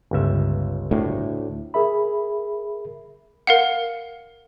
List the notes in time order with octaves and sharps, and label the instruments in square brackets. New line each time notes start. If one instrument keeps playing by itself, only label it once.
[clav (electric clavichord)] G1 C#2 E5
[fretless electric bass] D2 A2
[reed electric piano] G#4 A#4 E5 B5
[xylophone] A#4 F5 F#5